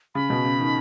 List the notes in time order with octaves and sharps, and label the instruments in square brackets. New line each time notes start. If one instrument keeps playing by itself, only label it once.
[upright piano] C#3 [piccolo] B5
[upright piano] B2
C#3
D#3